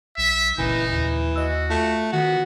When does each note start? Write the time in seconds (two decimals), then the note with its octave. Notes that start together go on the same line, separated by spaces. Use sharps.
0.17 B1 E5
0.58 G1 C#2 A#2 C#3 E3 D#4
0.91 D#2 E3
1.36 F#4 D#5 E6
1.70 A3 F4
2.13 D#3 B3 F#4